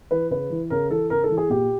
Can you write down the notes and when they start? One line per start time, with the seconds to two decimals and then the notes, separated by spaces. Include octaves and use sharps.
0.11 E3 B4
0.30 C#3 B4
0.50 E3
0.70 C#3 A#4
0.90 E3 A4
1.10 C#3 A#4
1.24 A4
1.30 E3
1.37 G#4
1.50 A#2 G4